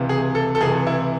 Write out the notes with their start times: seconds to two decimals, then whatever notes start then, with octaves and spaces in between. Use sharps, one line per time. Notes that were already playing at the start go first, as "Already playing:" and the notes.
Already playing: C#2 C3 E3
0.09 G#4
0.35 A4
0.55 A4
0.61 C#2 C3 E3 G#4
0.87 E4